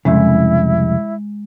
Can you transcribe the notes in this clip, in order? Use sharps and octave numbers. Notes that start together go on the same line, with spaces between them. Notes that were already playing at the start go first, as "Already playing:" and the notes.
C2 F2 C#3 G#3 E4